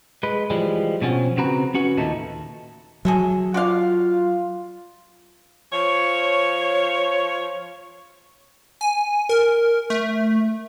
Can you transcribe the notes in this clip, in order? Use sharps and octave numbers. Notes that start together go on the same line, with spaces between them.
G#3 B4
E3 F3 G3 G#3
B2 F3 C4 C#4 F4 F#4
C#3 C4 F#4 B4 A#5
C#4 F#4 B4
D#2 A#2 A3 D#4 A5
F#3 G#4 A4 E5
F4 F#4 D5 F5
F3 C#5
G#5
A#4
A3